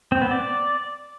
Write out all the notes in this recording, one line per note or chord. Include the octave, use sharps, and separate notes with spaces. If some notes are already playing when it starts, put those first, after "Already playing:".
C4
B3
D5